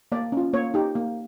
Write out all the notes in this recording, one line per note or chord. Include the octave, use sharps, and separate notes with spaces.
A#3 D5
C#4 F4
A#3 C#5
D#4 G4
A#3